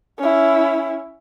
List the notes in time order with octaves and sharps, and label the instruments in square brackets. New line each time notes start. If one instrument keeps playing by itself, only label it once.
[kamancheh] C#4 E4